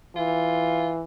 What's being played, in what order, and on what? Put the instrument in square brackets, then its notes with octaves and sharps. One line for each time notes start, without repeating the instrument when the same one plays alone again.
[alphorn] E3 [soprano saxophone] F4